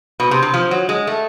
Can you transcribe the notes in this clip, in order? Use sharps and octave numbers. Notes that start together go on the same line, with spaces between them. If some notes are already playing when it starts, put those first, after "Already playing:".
B2
C3
C3
F3
F#3
G#3
A3